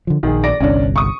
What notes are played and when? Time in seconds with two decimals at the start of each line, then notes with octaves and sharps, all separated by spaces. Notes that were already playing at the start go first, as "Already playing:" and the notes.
0.07 D3 F3
0.23 A#1 D#3 G#4
0.44 D5 A#6 D7
0.60 G1 C2 C#4 D4
0.96 C#6 D#6